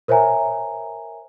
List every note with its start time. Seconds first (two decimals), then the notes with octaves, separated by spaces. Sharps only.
0.08 A#4 C5 C#5 E5 G#5 A#5